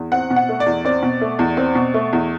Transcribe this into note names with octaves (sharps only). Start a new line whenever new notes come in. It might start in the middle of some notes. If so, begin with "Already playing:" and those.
Already playing: E2
C4 F#5
B2
F#5
A3
D5
E2
C4 D5
B2
A3
E2
C4
B2
A3
E2